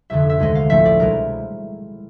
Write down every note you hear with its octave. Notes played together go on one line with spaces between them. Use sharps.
F1 F2 D3 E5
E5
D2 C3 D#3 G#3 D#5
F5
A#1 A2 F3 A3 E5
D5
C2 B2 G#3 A#4